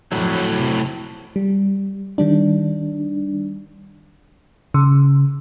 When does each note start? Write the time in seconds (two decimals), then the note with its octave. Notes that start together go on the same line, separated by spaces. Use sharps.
0.12 F2 A2 F#3
0.59 C3
1.36 G3
2.18 D#3 G3 D4
4.74 C#3